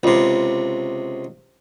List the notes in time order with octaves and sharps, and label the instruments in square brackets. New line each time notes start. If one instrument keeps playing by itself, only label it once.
[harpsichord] C#2 C3